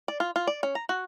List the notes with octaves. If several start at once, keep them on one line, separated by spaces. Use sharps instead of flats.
D5
F4
F4
D5
C#4
A#5
F#4